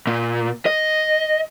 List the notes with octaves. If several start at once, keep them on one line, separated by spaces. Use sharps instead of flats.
A#2
D#5